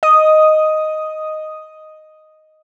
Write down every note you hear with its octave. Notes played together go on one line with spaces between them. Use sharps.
D#5 D#6